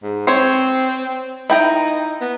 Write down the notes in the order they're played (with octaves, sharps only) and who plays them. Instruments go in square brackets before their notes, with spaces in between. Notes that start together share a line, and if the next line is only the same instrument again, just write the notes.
[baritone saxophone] G#2
[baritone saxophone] C4 [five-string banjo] C5 C#5
[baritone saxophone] D#4 [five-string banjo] E4 G5 A#5
[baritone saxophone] B3